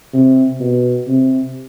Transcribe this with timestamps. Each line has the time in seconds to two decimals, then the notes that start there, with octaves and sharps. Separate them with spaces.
0.14 C3
0.61 B2
1.08 C3